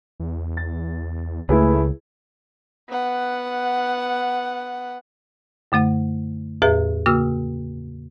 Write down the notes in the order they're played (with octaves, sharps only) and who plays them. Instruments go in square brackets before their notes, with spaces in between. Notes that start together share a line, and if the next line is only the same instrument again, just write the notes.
[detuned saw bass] E2
[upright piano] A6
[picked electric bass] C#2 [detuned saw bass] A3 [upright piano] E4 G#4 B4
[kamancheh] B3 F#5
[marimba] F#2 D3 A3 F#5
E2 A2 G#4 B4 E5
C#3 A#3 F#4 E6 F6